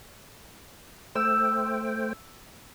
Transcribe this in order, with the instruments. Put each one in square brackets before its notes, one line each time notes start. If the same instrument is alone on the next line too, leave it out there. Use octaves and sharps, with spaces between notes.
[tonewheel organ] A3 C5 G5 [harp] E6